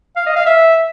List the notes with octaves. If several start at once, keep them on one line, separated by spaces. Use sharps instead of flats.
F5
D#5
F5
E5